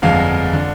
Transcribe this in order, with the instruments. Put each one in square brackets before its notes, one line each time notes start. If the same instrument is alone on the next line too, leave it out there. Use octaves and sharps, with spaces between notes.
[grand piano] G1 F2 D3 G#3 F5
D3